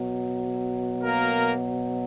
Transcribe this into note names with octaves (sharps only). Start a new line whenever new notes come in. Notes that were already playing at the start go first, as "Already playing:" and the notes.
Already playing: B2 F#3
A#3 A#4